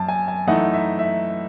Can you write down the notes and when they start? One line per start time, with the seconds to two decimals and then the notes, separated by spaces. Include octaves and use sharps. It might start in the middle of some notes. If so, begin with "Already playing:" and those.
Already playing: F#2 A5
0.08 G#5
0.28 G#5
0.47 F#2 E3 A3 D#4 F#5
0.74 E5
0.99 E5